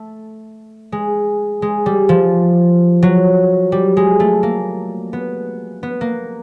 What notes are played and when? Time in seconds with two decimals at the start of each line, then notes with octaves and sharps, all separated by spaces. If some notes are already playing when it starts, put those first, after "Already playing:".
Already playing: A3
0.92 G#3
1.62 G#3
1.86 G3
2.09 F3
3.02 F#3
3.72 G3
3.97 G#3
4.20 A3
4.43 A#3
5.13 B3
5.83 B3
6.01 A#3